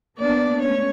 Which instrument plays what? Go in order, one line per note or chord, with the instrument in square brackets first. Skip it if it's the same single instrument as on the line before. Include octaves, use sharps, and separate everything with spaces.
[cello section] A#3 D4 [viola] B3 D5
[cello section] G#3 A3 C#4 [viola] C#5